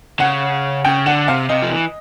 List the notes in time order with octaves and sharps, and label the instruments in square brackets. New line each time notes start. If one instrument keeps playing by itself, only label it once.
[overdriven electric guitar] C#3 [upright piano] F#5
[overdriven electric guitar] C#3 [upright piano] G5
[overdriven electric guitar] D3 [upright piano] F#5
[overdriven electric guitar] C3 [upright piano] F5
[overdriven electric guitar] C3 [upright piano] D#5
[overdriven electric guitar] F3
E3